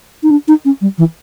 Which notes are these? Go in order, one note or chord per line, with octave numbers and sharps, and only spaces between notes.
D#4
D4
D#4
C#4
G3
E3